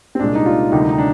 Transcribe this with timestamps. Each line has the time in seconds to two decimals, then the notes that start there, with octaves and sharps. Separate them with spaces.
0.15 C4
0.19 C2 A#2 G#3 D4
0.35 D#4
0.46 F4
0.72 D2 C3 D#3 G3 D#4
0.89 D#4
0.98 D4